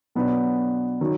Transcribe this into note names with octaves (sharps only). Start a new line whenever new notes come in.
B2 F#3 B3 D4
D#3 F#3